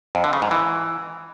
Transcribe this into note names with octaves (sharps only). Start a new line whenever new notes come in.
F2
D3
C#3
G#2
E3